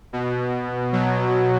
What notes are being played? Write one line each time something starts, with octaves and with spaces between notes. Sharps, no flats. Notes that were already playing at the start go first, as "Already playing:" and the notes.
B2
B2 F#3